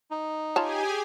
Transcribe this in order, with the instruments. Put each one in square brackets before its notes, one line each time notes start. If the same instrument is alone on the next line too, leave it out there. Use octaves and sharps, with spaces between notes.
[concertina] D#4
[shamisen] F4 C#5 A5 [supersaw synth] G4 G#4 G#5